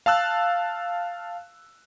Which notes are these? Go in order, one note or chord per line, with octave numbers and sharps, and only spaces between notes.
F5 A5 E6 F#6